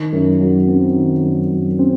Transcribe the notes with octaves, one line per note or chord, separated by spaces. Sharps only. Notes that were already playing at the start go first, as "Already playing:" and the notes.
Already playing: D#3
F#2
F#3
C4
D#3
F#2
F#3
C4